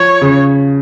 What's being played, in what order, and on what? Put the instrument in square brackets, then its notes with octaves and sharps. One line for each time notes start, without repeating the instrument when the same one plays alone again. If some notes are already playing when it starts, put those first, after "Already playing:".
Already playing: [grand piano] F3 [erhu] C#5
[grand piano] C#3